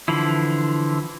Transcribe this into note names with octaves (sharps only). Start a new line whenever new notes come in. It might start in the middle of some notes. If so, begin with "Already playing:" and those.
D3 E3 F3 E4